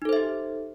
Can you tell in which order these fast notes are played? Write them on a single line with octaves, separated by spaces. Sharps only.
D#4 A4 C5 E5 G4